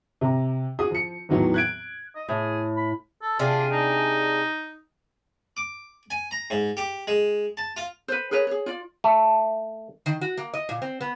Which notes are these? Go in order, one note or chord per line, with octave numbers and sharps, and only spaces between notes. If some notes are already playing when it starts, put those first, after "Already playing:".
C3 A#5
F#4 G#4 D#6
F3 C#7
E2 A2 D#3 E3 F#3 B3
F#6 G#6 D7
D#5
A2 G#4
B5
A4
C3 D4 F4 G#4
D#4
D6
G#5
A#5
G#2
G4
G#3
A5
F4
B4 C5
G#4 A#4 B4 C#5
G#4 C#5
F4 D5
A3
D#3
F#4
A#3
D#5
A#2
C4
B3